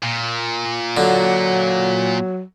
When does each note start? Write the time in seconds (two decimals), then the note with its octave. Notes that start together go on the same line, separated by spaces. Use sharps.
0.03 A#2
0.97 D3 F#3